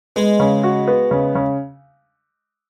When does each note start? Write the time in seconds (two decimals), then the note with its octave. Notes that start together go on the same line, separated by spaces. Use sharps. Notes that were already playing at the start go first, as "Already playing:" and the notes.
0.16 G#3 B3
0.40 C#3
0.63 F#4
0.88 B3
1.11 C#3
1.35 C#3